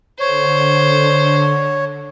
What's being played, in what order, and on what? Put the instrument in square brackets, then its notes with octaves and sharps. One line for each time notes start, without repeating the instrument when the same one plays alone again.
[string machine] D3 [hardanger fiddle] C5 [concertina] C#5